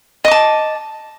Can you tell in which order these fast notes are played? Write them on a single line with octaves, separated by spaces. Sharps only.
D#5 D6 A5